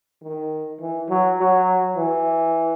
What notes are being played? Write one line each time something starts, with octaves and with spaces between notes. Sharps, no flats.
D#3
E3
F#3
F#3
E3